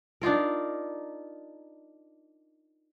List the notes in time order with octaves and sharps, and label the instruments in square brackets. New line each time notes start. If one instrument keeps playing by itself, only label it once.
[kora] D4 D#4 F4 A#4